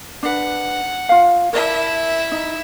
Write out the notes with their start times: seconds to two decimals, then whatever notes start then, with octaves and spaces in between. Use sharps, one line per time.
0.23 D4 B4 F#5
1.09 F4 F5
1.53 E4 A#4 D5 E5 A5
2.32 D#4